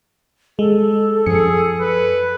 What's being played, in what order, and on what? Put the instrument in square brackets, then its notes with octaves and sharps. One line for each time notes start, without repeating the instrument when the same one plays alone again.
[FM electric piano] G#3 [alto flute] A4
[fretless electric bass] F#2 F3 [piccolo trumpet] G#4 [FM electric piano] C#7
[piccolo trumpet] B4